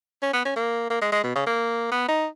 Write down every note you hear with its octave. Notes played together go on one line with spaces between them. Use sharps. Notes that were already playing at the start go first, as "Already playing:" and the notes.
C#4
B3
C#4
A#3
A#3
G#3
G#3
B2
C#3
A#3
B3
D#4